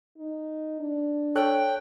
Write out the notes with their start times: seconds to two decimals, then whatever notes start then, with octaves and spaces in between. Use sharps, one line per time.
0.18 D#4
0.80 D4
1.36 A4 C#5 G5 F#6